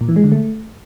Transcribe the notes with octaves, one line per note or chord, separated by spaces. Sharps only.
A#2
E3
G#3
D3
A3